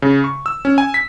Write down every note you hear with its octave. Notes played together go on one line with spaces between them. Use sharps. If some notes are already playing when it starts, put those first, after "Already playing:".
C#3
C#6
E6
C#4
G#5
B6